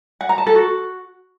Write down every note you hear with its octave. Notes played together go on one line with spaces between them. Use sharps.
F#5
A#5
A5
A4
F#4